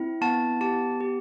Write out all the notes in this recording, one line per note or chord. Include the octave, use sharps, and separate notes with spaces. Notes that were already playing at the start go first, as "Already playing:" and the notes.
Already playing: C4 E4
B3 A5
G4 A5
G4